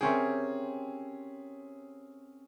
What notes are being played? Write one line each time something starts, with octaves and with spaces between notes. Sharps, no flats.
C4 C#4 G4 G#4 A#4 E5